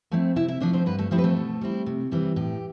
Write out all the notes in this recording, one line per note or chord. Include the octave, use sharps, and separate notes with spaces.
F3 A3 C4 E4
C3 E4 E5
E4 E5
F3 A3 D4 D5
C4 C5
G2 B3 B4
A3 A4
F3 A3 C4 E4 G4
B4
A3 A4
B2
G3 C4 E4
C3
E3 G3 C4
A2 G4